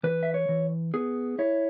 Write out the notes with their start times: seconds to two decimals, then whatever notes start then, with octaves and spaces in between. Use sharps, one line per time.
0.03 E3 B4
0.23 E5
0.34 C#5
0.49 E3
0.94 B3 G#4
1.39 E4 C#5